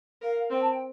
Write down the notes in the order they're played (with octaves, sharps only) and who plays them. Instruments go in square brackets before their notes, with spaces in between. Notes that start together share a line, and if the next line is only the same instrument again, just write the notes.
[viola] A#4 [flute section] F5
[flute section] F5
[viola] C4 [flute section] G5
[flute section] A5
G5